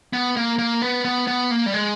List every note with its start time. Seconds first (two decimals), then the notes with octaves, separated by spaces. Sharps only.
0.13 B3
0.37 A#3
0.59 A#3
0.82 B3
1.05 B3
1.27 B3
1.51 A#3
1.66 G3
1.74 G#3